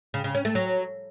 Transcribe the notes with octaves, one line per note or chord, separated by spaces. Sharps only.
C#3
C#3
C#4
A3
F#3